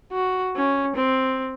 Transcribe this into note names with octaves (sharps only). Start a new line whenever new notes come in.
F#4
C#4
C4